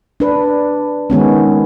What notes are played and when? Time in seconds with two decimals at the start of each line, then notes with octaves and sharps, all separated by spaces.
0.20 D4 B4
1.10 D#3 G#3 B3 C#4